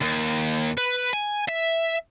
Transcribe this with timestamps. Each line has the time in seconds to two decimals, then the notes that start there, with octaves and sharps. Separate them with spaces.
0.01 D#2
0.78 B4
1.13 G#5
1.49 E5